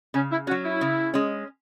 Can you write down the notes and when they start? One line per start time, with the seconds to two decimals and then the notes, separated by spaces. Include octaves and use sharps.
0.14 C#3 C#4
0.31 E4
0.47 C#4 F#4
0.51 F#3
0.64 E4
0.81 C#3
1.14 G#3 C#4